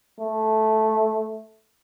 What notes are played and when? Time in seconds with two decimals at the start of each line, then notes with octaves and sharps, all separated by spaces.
0.20 A3